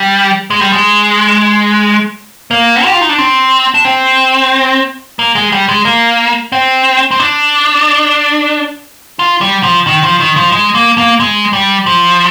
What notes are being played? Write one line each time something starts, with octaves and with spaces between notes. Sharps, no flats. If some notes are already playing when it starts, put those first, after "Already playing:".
Already playing: G3
G#3
G3
G#3
A#3
G4
F4
D#4
D4
C4
D4
C4
A#3
G#3
G3
G#3
A#3
C4
C4
D4
F4
G3
F3
D#3
F3
D#3
F3
G#3
A#3
A#3
G#3
G3
F3